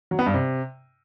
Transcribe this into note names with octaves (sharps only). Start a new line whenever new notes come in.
F#3
B3
G2
C3